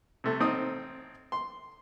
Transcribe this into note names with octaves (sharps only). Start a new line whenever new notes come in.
C3 A3
A1 C4 D#4 D#6
C6